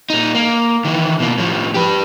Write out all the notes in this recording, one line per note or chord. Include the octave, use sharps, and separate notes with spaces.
A#2 D#4
A#3
D#3 E3
B2 A#3
A2 F3
G4 B4